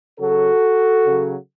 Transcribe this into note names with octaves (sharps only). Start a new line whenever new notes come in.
C#3 F#3 F#4 A4
C#3 F#3